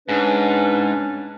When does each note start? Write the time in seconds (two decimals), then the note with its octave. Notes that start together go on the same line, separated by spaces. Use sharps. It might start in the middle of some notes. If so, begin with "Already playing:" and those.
0.09 G#2 C#3 C#4 D4 B4